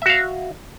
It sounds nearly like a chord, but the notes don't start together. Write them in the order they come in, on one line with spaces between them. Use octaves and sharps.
E5 F#4 F5